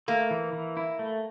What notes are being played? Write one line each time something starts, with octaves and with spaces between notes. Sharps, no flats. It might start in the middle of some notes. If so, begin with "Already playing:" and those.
A3 A#3
E3
E3
E4
A3